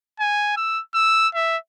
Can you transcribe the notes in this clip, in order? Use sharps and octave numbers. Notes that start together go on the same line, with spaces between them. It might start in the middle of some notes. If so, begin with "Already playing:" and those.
G#5
E6
E6
E5